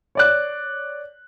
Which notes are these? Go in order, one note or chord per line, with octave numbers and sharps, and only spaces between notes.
C#5 D5 F#6